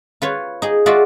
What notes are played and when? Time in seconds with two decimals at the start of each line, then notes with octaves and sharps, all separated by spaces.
0.22 F4 B4 C#5
0.62 D#4 G#4
0.86 G#3 F4 F#4 D5 E5